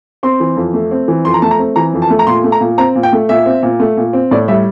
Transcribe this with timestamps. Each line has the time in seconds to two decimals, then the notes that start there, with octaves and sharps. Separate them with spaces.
0.23 C4 C6
0.40 E3
0.57 F2
0.74 A3
0.91 C4
1.08 E3
1.25 F2 C6
1.34 A#5
1.42 A3 A5
1.51 A#5
1.59 C4
1.76 E3 A#5
1.93 F2
2.02 A5
2.10 A3
2.19 A#5
2.27 A#2 C6
2.44 A3
2.52 A#5
2.60 A#2
2.78 C4 A#5
2.95 A#2
3.03 G5
3.13 A3
3.29 A#2 E5
3.46 C4
3.63 A#2
3.80 A3
3.97 A#2
4.13 C4
4.31 A2 D5
4.48 G3 E5